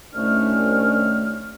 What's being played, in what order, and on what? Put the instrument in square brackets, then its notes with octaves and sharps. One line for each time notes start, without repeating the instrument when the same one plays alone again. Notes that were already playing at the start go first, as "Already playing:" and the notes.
[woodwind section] C2 A3 F6 [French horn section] D#3 C#4 D4